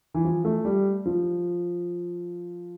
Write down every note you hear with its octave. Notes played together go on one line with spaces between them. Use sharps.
E3
F3
A3
G3
F3